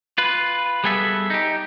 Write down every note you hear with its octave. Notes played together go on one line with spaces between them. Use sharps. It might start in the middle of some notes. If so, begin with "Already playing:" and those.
F4 B4
G3 B3 G#4 A4 E5
D#4 G4